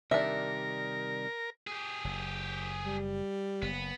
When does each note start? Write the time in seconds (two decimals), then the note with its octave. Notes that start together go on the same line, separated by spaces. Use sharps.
0.11 C3 D#3 G3 D4 A#4 E5
1.67 G4 G#4
2.05 F#1
2.84 G3
3.62 F#1 B3